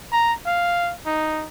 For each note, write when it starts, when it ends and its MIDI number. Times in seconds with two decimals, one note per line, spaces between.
0.12 0.33 82
0.46 0.93 77
1.06 1.47 63